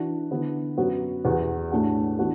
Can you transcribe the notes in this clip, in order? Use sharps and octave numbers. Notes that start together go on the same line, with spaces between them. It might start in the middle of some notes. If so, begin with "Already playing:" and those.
Already playing: E3 D4 F#4
D3 B3 E4
F#2 F#3 B3 F#4
E2 E3 B3 F#4
A2 A3 D4 F#4
E3 B3 D4 F#4